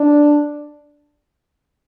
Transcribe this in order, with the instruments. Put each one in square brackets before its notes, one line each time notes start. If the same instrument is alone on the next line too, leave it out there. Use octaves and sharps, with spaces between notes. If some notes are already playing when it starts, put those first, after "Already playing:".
Already playing: [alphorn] D4